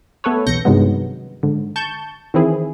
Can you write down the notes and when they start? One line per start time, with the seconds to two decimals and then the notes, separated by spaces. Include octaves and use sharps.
0.24 A3 B3 A4 B4 C#5
0.46 B1 E2 G6 A#6 C#7
0.65 G2 C3 D#3 F#3 G#3 B3
1.43 G#2 D3
1.76 A5 C#6 G6
2.34 D#3 E3 C4 E4 G#4